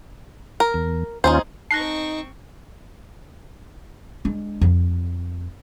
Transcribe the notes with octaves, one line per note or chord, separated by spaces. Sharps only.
A#4
E2
D#2 C#4 D#4 F4 G#4 C5
C4 D#4 A5 C#6 F#6 A#6 C7
G#3 D4
F2